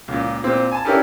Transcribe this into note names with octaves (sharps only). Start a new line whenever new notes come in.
C#2 A#2
A#2 C4
G#5 A5
C#4 D4 E4 G4 A4 A#4